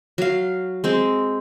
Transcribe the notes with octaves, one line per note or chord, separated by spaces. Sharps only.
F#3 F5
G#3 C4